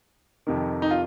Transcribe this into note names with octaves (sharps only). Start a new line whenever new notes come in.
F2 C3 D#3
D#4
F4